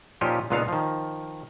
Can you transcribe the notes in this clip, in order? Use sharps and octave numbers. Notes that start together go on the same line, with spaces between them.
A#2 F3 C#4 D#4 F4 G4
C#2 A#2 B3 D4 D#4 F5
D#3 F3